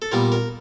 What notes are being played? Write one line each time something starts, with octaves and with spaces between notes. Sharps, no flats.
A4
A#2 G3 B3 A#4
A#4